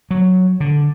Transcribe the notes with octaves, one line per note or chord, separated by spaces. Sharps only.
F#3
D3